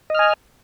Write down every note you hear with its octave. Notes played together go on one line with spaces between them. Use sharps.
D#5 G#5 F6